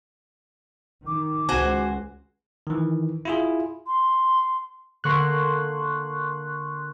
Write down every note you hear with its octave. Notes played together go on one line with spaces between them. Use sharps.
D#3 D6
C#2 F#4 C5 G#5
D#3 E3
E4 F4 G#4
C6
D3 A#3 A#4 C6 C#6 F#6